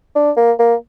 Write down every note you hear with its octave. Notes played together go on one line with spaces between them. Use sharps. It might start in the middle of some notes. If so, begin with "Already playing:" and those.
D4
A#3
A#3